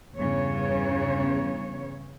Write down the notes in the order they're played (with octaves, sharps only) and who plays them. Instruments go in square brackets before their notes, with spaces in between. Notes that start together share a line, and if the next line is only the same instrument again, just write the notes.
[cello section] E2 G2 C#3 C#5